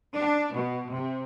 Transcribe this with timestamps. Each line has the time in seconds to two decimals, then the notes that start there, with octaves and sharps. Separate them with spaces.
0.16 D4
0.55 B2
0.93 C3